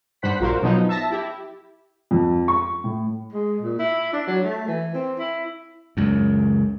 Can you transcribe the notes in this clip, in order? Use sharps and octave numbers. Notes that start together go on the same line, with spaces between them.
G2 C5 F#5 B5 B6
A#1 A#2 F#4 A#4 C5 F5
B2 F3 F#3 B3 D#4
E5 A5 A#6
E4 G4
F2
C#6
A2
G#3
A#2
E4
D4
F#3
A3
E3
C4
E4
C#2 F#2